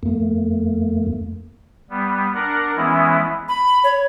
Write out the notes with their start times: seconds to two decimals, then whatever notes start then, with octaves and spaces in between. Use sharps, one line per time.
0.03 F2 A3 A#3
1.90 G3 B3
2.35 D4 A#4 F#5
2.76 E3 G#3 B3 C#4 E4
3.48 B5
3.84 C#5